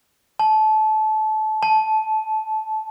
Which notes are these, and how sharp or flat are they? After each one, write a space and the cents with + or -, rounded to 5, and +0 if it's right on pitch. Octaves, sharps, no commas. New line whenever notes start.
A5 -25
A5 -15